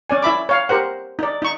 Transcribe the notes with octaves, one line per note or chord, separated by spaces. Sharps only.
C#4 D5 G#5
E4 E5 B5 D6
C#5 F5
G4 A#4 C5 F#5
D#4 D5
D#4 C#6